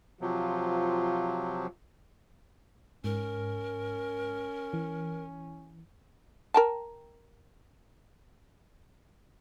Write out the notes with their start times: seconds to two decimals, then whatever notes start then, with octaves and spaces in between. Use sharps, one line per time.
0.21 C3 F3 F#3 F4
3.04 G#2 C#4 A#4
4.73 E3
6.54 A#4 G5 A5